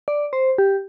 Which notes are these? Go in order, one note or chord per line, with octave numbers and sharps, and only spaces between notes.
D5
C5
G4